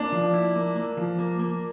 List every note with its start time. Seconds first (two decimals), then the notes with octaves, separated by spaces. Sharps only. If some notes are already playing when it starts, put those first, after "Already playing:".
Already playing: A#3 D4
0.12 F3
0.34 E4
0.55 A#3
0.76 A#3
0.97 F3
1.19 A#3
1.39 A#3